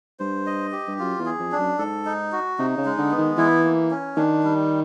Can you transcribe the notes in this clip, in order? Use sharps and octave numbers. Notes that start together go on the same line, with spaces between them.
G2 C5
D#5
G4
G2
F#2 F4
E2
G#4
F2
D4
F#2
G#2 A4
D#4
F#4
C3 D#4
C#3
G#3
D3
B3
D#3
E3 E4
A#3
C#4
D#3 D4
G3